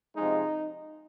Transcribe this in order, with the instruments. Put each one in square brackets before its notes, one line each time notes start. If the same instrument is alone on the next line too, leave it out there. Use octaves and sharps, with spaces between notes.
[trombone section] C3 F3 G#3 D#4